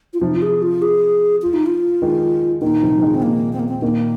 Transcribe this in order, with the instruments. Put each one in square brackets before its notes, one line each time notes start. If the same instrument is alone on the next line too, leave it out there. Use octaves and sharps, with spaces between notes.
[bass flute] F4
[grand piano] C3 F3 [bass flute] D#4
[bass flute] F4
G#4
F4
G#4
F4
D#4
F4
[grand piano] D#3 G#3
[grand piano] A#2 D#3 [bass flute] D#4
[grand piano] C3 F3
F3
D#3 G#3
[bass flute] C4
[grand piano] A#2 D#3 [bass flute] A#3
[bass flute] C4
A#3
C4
[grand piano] A#2 D#3 [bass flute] A#3